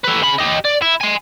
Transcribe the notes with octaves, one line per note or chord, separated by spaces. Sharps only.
A4 B4
C#3 B5
G4 D#5
D5
E4
G#5 C6